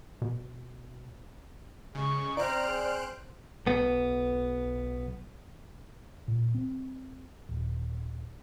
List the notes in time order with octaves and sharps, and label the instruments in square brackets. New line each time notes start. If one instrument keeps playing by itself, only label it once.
[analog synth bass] B2
[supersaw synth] C#3 [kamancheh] G#3 C#6
[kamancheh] C4 F6 [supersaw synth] C5 F#6 D7 [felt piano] D5 [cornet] A#5
[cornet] G#4
[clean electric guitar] B1 B3
[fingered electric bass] A#2
C4
D#1